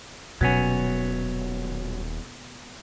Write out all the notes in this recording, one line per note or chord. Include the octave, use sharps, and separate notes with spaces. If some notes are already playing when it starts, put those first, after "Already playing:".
D#1 B2 F#3 B3 C#4